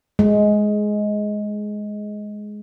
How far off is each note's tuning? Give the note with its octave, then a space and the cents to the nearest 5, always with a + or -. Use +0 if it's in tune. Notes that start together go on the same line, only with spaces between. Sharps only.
G#3 +10